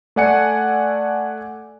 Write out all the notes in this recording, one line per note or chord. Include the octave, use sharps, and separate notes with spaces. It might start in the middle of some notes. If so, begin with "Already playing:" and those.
A3 A4 D5 F#5 G#5 C#7